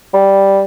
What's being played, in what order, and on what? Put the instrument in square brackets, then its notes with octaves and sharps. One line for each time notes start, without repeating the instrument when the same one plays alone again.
[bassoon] G3